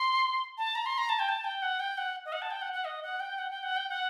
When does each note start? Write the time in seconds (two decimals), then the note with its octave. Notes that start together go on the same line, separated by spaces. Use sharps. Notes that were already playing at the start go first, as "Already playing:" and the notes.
Already playing: C6
0.58 A5
0.75 A#5
0.86 C6
0.98 A#5
1.09 A5
1.19 G5
1.29 A5
1.44 G5
1.62 F#5
1.80 G5
1.98 F#5
2.25 D#5
2.33 F#5
2.42 A5
2.51 G5
2.62 F#5
2.73 F#5
2.85 D#5
3.03 F#5
3.20 G5
3.38 F#5
3.50 G5
3.63 F#5
3.76 G5
3.89 F#5